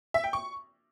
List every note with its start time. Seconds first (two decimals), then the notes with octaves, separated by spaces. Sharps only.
0.14 E5
0.24 G5
0.33 C#6